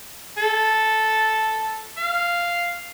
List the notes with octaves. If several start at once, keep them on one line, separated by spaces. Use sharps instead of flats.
A4
F5